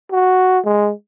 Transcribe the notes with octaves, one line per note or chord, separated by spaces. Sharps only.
F#4
G#3